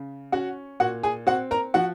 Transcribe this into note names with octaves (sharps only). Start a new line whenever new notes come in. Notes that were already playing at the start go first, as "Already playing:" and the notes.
Already playing: C#3
C#4 F#4 F#5
A#2 F#4 F#5
G#4 G#5
C4 F#4 F#5
A#4 A#5
F3 F#4 F#5